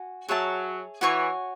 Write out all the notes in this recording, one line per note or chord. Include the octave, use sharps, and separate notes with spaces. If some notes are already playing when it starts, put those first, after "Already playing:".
Already playing: F#4 G#5
F#3 G#4 C#5 E5 A5
E3 F#4 C#5 G#5 C#6